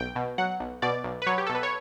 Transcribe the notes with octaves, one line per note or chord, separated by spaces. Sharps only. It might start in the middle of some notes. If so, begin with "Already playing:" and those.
Already playing: B1 G5
B2
F#3 F#5
B1
B2 D5
B1
B4
F#3 C#5
G4
B1 A4
B4
C#5